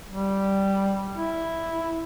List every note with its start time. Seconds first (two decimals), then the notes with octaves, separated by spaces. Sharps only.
0.10 G3
1.16 E4